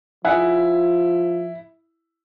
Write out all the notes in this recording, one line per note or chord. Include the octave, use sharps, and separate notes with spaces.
F3 E4 G#4 F#5